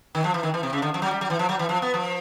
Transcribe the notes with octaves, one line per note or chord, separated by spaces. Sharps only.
D#3
F3
E3
D#3
E3
C3
C#3
D3
F3
F#3
G3
F#3
E3
F3
F#3
E3
F3
B3
F3